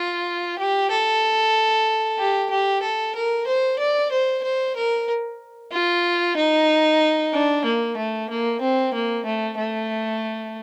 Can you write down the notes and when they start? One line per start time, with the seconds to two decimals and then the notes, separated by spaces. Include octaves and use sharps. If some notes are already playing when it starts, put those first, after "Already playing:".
Already playing: F4
0.58 G4
0.90 A4
2.19 G4
2.50 G4
2.82 A4
3.15 A#4
3.46 C5
3.79 D5
4.12 C5
4.43 C5
4.76 A#4
5.72 F4
6.37 D#4
7.33 D4
7.65 A#3
7.97 A3
8.30 A#3
8.61 C4
8.94 A#3
9.25 A3
9.57 A3